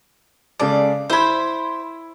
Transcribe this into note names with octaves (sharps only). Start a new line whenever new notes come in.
C#3 G#3 A4 D5
E4 C5 B5 G#6